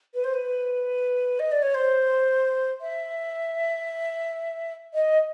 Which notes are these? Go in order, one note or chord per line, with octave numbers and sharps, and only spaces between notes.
B4
C5
B4
D#5
D5
C#5
C5
E5
D#5